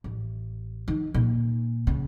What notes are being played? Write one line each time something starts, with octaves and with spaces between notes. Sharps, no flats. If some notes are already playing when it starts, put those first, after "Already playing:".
A1
D#3
A#2
C#3